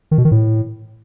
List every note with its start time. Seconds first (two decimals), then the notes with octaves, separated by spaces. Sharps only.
0.11 D#3
0.18 B2
0.25 D#3
0.31 A2